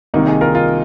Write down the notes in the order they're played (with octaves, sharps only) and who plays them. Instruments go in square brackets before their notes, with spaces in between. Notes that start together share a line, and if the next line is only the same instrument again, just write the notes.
[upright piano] C2 C3 D#3 [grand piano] A#3 D#4
[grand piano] D#4 G#4
F4 A#4
F4 A#4